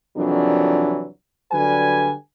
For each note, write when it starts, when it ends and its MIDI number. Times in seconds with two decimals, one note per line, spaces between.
0.16 1.06 36
0.16 1.06 41
0.16 1.06 51
0.16 1.06 52
0.16 1.06 54
0.16 1.06 62
1.51 2.13 50
1.51 2.13 54
1.51 2.13 55
1.51 2.13 71
1.51 2.13 80